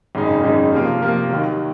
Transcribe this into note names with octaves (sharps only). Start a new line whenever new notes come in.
G#1 F#2 C#3 G#3 D#4
G#1 F#2 C#3 G#3 D#4
C3 F3 A#3 F4 A#4
C3 F3 A#3 F4 A#4
D#2 D#3 F#3